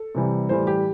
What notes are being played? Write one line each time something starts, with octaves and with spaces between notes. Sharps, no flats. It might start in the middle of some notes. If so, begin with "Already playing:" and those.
Already playing: A4
C3 E3 G3
A2 E3 G3 C5
G4